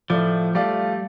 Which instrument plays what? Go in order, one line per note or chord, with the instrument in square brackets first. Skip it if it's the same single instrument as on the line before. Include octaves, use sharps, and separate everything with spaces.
[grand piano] A2 A3 F4 D5 [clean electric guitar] F3
[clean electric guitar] G3 [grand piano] A3 F4 D5 F5